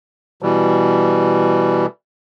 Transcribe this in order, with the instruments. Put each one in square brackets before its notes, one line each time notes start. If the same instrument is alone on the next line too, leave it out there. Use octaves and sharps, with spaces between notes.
[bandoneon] B2 E3 G3